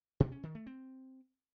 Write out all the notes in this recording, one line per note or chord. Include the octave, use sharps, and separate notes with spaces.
B2
C#4
D#3
A3
C4